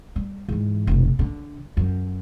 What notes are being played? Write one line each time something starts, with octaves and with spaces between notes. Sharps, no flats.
G3
G#2 E3
F1 B1
D3
F#2